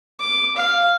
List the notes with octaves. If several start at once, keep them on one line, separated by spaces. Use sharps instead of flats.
D6
F5